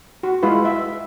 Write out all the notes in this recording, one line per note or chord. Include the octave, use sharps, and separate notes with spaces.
F#4
G#3 E4 F4 B4
E5